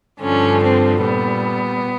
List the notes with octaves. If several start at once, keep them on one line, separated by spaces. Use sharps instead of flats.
G2 D3 F3 C#4
C4
A#2 G3 B3